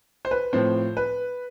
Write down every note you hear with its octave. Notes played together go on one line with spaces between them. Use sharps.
C5
B4
A2 F3 C4 C5
B4